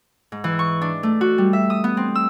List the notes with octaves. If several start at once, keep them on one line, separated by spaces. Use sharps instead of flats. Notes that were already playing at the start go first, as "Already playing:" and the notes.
G#2
E3
C#6
D4
A3
F#4
G3
E5
D#6
B3
C4
E6